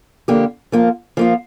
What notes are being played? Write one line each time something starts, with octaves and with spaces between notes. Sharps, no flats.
F2 D3 A#3 G4
F3 A#3 F4
F3 A#3 F4